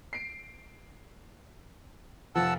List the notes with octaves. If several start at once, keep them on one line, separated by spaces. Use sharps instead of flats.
C7 D7
F1 F3 F#5 A5 E6